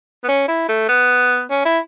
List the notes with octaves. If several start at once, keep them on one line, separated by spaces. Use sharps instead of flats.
B3
C#4
E4
A3
B3
C#4
E4